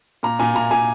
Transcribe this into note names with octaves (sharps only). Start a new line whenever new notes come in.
A#2 A#5
A#2 G#5
A#2 A#5
A#2 G#5